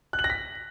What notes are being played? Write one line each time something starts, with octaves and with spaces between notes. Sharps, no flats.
F#6
F#7
A#6
B6